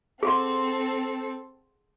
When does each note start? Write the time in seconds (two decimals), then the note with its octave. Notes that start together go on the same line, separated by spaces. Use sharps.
0.23 C4 G#4 A4 F#5 C6